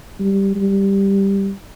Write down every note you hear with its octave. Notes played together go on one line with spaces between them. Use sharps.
G3
G3